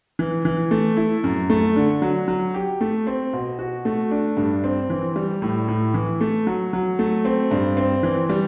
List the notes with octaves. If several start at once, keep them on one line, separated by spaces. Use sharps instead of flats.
E3
E3
A3
E4
F#2
A3
D3
F#3
F#3
G4
A3
C4
B2
F#4
A3
D4
G2
C4
E3
G3
A2
A2
E3
A3
F#3
F#3
A3
C4
G2
C4
E3
G3